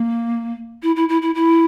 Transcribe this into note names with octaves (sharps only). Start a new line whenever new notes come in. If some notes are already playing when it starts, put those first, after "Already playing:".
Already playing: A#3
E4
E4
E4
E4
E4